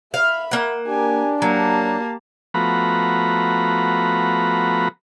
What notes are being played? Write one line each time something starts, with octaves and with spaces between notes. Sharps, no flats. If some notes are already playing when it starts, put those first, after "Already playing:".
E5 F5 B5
A#3 F#5
D4 G4 A#4 G#5
F#3 A#3 G4 A5
F3 A3 B3 F#4 A#5 B5